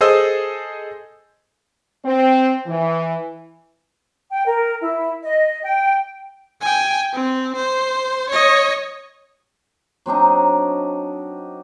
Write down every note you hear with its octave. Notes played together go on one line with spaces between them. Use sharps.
G#4 A4 C5 D#5 D#6 E6
C4
E3
G5
A#4
E4
D#5
G5
G5 G#5
C4
C5
C#5 D#5
F#3 C4 D4 D#4